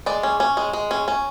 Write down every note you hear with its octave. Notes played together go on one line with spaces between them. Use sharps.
G#3 D5
C#4
C#4
G#3
G#3
C#4
C#4